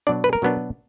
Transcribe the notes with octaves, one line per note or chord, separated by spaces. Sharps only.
B2 F#3 B3 D4 D5
B4
A#4
B2 F#3 B3 D4